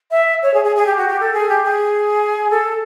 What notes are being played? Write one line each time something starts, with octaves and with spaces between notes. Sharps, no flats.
E5
C#5
G#4
G#4
G#4
G4
F#4
G4
A4
G#4
G4
G#4
A4